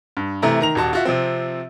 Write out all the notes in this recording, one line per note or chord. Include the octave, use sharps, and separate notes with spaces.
G2
C3 E3 A3 A#5
D#3 A#5 F7
D#1 F#4 A5
F4 F#4 E5
C3 F3 C4